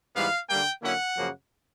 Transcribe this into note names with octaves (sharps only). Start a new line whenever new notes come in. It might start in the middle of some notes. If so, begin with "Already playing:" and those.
G#2 E3 G3 B3 F5
D3 G3 A#3 G5
D3 F#3 A#3 C#4 E4 F#5
F#2 C#3 F3 A#3